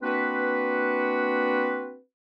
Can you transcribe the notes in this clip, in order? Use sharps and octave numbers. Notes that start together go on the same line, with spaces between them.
A#3 C4 D4 F#4 B4